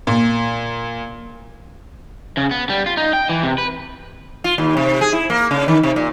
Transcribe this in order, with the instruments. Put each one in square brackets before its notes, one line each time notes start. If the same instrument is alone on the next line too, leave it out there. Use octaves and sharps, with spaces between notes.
[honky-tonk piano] A#2
[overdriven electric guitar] C#3
B3
G3
F4
D#4
G5
E3
C3
B4
[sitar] F4
D#2
C3
G#4
E4
A#3
C#3
D#3
C3
A#2